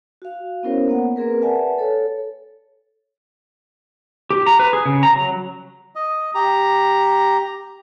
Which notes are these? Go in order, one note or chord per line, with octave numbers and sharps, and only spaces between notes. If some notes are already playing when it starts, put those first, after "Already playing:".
F#4 F5
B3 C#4 E4 A#4 C5 C#5
A#3 B3 F#5
A#3 C4 G#4 A#4 B4
B4 D5 E5 F#5 G#5 A5
A4 C#5
G4
A#5
B4
G#4
C#3
A#5
F#3
D#5
G4 A#5